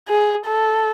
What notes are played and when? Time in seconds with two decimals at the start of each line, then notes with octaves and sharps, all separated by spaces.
0.09 G#4
0.46 A4